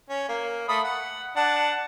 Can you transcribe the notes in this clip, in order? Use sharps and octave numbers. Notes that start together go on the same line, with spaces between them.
C#4
A#3
A3 B5 D#6
F#5
D4 F#5 A5